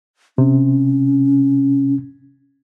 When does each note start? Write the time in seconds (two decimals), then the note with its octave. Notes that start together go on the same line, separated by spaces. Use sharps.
0.38 C3 C#4